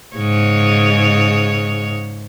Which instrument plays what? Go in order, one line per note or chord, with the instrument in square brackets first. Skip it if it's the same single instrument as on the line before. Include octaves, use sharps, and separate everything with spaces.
[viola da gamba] G#2 C#3 C#5